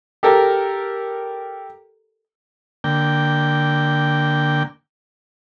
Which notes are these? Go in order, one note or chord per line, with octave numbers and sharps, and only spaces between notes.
G4 A4 A#4
D3 A#3 G5